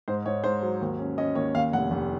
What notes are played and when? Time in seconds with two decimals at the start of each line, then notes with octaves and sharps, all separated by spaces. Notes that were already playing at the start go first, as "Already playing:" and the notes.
0.08 G#2 C5
0.26 G#2 C#5
0.44 G#2 C5
0.62 F#3
0.81 D#2
0.99 C#4
1.18 C#4 D#5
1.35 D#2 C#5
1.54 D#2 F5
1.72 F1 F#5
1.91 F1